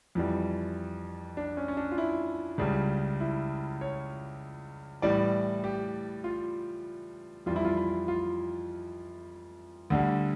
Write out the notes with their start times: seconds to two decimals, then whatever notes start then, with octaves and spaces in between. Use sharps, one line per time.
0.15 F2 E3 G3
1.37 D4
1.57 C#4
1.68 C#4
1.77 D4
1.92 F4
1.98 E4
2.58 C#2 C#3 G3
3.20 E4
3.81 C#5
5.02 A2 E3 G3 D5
5.64 G4
6.24 F4
7.46 F2 E3 G3 F4
7.56 E4
7.65 F4
7.77 E4
8.08 F4
9.90 D2 D3 G3